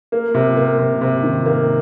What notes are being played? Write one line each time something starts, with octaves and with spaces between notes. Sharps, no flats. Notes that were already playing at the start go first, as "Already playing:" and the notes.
A#3
C3
A#3
C3
C3
D#3
A#3